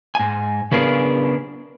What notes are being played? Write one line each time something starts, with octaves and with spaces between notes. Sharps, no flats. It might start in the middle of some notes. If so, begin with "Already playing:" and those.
G#2 G#5
C#3 B3 D4 G#4 A#4